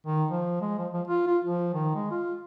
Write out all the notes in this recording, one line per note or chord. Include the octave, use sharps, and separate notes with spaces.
D#3
F3
G#3
F3
F3
F4
F4
F3
D#3
G#3
F4